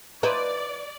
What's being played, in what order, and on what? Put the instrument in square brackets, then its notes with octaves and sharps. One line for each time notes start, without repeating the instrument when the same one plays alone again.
[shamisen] F3 D#4 E4 [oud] B4 [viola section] D5